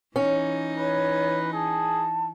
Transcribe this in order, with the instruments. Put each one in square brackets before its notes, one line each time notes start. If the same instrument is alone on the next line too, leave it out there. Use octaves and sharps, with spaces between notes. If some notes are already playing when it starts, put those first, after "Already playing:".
[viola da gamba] E3 D#4 [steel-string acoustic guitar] C#4
[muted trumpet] B4 [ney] C#5
[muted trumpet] G#4 [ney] A5